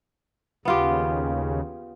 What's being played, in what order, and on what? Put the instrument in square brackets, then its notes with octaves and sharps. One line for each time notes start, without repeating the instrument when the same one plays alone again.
[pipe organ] D#2 C#3 [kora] B3 F4 G4